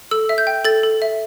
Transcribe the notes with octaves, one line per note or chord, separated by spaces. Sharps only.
A4 E6
E5
G6
G5
A4 A6
A4
E5